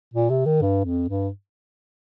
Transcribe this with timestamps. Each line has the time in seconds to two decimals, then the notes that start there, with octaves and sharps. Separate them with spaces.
0.14 A#2
0.30 C3
0.46 D#3
0.62 G2
0.85 F2
1.09 G2